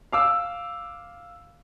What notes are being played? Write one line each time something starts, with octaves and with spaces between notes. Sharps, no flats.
F5 D6 E6